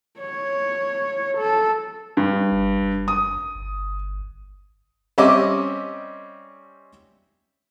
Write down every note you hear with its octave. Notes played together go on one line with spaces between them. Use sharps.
C#5
A4
G2
G1
F#1
D#6
G1
G3 C4 C#4 D#5 E5 D6